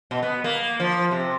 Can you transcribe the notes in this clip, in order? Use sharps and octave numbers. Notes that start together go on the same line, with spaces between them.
B2
B3
A#3
F3
C3